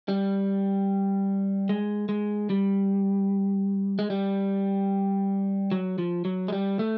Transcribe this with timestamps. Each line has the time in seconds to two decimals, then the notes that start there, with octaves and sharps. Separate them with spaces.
0.08 G3
1.69 G#3
2.09 G#3
2.50 G3
3.99 G#3
4.10 G3
5.72 F#3
5.98 F3
6.25 F#3
6.48 G#3
6.53 G3
6.79 A3